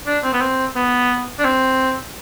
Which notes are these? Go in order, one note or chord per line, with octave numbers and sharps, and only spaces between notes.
D4
C4
B3
C4
B3
D4
C4